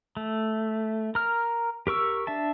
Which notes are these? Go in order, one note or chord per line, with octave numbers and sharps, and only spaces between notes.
A3
A#4 F6
G4 A#4 C#6 E6
D4 E5 A5